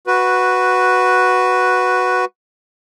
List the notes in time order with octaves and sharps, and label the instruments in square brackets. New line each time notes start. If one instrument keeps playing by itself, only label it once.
[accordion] F#4 B4